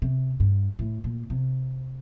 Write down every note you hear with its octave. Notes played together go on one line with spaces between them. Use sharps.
C3
G2
A2
A#2
C3